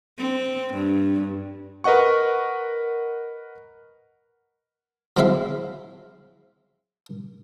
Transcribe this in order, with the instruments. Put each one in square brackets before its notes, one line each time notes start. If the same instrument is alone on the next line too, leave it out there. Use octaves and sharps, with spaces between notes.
[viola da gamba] C4
G2
[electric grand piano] A#4 B4 D#5 F#5 C#6
[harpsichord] F#3 G#3 C4 E4 E5 F5